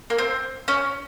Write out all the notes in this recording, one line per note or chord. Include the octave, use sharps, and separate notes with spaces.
A#3
C4
C#4